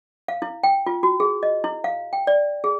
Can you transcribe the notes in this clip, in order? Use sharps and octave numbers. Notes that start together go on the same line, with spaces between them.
F5
E4
G5
F4
F#4
G#4
D#5
E4
F5
G5
D5
G#4